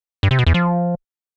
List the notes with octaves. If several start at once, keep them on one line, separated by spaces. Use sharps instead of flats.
G2
C3
B2
E2
F3